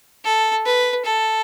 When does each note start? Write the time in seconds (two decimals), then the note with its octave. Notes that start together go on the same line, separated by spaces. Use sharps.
0.25 A4
0.65 B4
1.05 A4